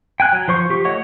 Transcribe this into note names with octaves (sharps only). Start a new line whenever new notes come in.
G5 G#5 F#6
F#3
F3 C5 C#6
F3 G4 C#6
A3 C#5 D#5 F#5 C#6